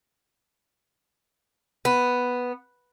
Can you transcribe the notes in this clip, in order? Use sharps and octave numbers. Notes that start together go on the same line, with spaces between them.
B3